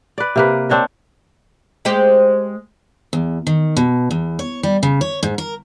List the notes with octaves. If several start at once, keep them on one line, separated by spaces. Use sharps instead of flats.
B4 D5
C3 A#3 B4
C4 D4 C#5 D#5
G#3 C4 G4
E2
D#3
B2
E2
C#5
G3
C#3
C#5
G#2
A#4